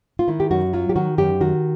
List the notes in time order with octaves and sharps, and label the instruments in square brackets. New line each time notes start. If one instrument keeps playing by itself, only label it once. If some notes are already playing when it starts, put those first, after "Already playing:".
[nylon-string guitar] F4
D#3 E4
G4
F#2 F#4
F#3 F4
G4
D#3 F#4
F#2 G4
D#3 F#4